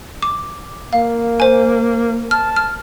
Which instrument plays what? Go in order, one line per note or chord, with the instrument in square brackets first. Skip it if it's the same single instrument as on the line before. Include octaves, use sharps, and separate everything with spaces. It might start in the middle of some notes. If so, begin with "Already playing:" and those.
[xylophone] D6
[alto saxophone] A#3 [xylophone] F5
[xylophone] C5 G#5
[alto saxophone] A5 [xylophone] F6
[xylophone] F6